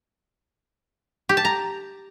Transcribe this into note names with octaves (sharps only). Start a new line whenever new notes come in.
G4
A5
A#5